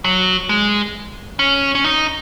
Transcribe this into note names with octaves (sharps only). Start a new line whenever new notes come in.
F#3
G#3
C#4
C#4
D#4